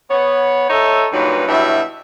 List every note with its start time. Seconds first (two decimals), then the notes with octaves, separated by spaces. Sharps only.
0.10 B3 C#5
0.69 D#4 A4 C#5 D#5 E5
1.12 G2 A#2 F#3 D#4 B4
1.48 G2 B2 F#3 E4 E5